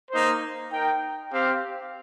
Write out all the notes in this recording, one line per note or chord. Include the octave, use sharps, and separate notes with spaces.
A#3 D#4 C5
D#4 A#4 G5
C4 G4 C5 F5